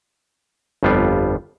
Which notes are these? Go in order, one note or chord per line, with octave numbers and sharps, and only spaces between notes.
G1 F2 G3 B3 F4